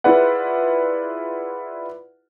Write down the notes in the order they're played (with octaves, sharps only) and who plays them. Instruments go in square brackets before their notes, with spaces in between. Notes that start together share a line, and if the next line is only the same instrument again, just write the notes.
[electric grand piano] E4 F4 G#4 B4 D5 F#5